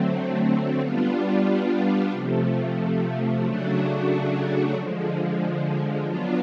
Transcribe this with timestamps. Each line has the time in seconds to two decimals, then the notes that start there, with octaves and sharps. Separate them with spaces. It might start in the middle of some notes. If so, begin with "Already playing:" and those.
Already playing: D3 F#3 A3 C4
0.80 G3 B3 D4 F4
2.11 C3 F3 A3
3.42 C#3 F#3 A3 D4 F#4
4.74 D3 F3 G#3
6.04 F#3 B3 D4 F4